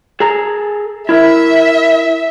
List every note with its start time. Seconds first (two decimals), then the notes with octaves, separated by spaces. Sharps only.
0.20 G#4 A4 A#5
1.09 E4 A#4 E5